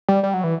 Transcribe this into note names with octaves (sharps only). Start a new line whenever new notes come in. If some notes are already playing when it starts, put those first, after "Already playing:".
G3
G3
F#3
E3